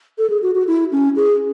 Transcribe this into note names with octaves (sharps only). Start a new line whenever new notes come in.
A4
G#4
F#4
F#4
E4
C#4
G#4